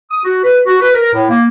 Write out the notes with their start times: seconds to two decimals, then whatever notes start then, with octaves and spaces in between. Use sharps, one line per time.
0.11 D#6
0.25 F#4
0.44 B4
0.66 F#4
0.81 B4
0.95 A#4
1.14 A2
1.30 A#3